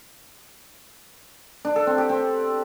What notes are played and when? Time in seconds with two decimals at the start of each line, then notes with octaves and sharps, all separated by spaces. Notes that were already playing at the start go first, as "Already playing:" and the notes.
1.65 D4
1.76 A4
1.87 C4
1.98 G4
2.09 C4